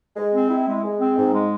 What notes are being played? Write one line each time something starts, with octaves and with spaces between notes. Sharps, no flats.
G#3
C4
E4
G#3
G#3
C4
G#2
G#3